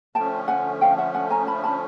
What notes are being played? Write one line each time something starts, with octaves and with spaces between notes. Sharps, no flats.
D3 F3 A3 C#4 G5 A5
F#5 G#5
F5 G5
E5 F#5
F#5 G#5
G#5 A#5
A5 B5
A5 B5